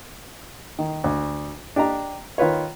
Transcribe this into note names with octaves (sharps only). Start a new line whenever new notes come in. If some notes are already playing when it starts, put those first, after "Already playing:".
D#3
D2
D4 G4 D#5 A#5
D#3 F4 B4 C#5